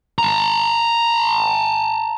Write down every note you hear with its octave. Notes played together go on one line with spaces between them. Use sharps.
A5 A#5